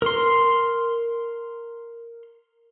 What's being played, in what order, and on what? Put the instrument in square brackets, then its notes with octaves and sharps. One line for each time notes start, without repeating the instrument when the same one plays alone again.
[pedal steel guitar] A#4 C6